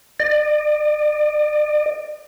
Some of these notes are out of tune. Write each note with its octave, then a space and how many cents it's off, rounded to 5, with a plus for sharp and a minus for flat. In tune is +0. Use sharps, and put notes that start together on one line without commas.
D5 +40